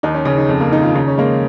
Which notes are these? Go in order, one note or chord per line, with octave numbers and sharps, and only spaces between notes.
D#2 D#4
C#4
C#3 C#4
D#4
F2
A#3
D#3 D#4
F4
C#3 D#4
C#4
G#3 A#3